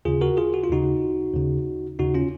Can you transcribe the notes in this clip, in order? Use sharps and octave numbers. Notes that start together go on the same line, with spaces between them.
D#2 C#3 F4 G#4
F#4 A#4
F4 G#4
F#4
F4
D#2 C#3 D#4 F#4
D#2 C#3
D#2 C#3 D#4 F#4
C#4 F4